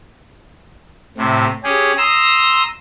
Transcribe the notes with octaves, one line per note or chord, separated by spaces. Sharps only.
A2 C3
C#4 G4 G#4
A#5 C6 D#6 E6